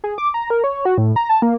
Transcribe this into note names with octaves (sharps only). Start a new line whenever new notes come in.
G#4
D6
A#5
A#4
C#5
F#4
A2
A#5
A5
A#3